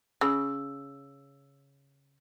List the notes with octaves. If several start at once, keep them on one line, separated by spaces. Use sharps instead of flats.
C#3 E6